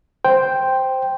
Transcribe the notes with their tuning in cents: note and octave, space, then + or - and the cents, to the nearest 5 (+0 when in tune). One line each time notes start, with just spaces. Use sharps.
C5 +0 G5 +0